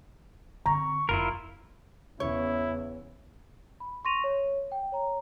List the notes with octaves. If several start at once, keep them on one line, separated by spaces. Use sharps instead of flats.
D3 C4 A#5 C#6
F1 E4 F4 A#4 B5
E2 C#3 C#4 E4 C#5
B5
C6 C#6 A#6 D#7 F7
C#5
G5
C#5 A#5